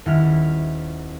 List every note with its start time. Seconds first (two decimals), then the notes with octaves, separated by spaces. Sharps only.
0.06 D#1 E4 B5 F6